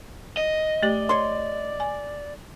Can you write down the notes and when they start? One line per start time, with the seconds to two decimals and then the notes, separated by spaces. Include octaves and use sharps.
0.37 D#5
0.83 A3 G4 D5
1.09 C#5 C6
1.80 G#5